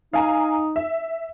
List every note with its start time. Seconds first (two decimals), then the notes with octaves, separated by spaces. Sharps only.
0.13 D#4 F5 G#5 A#5
0.76 E5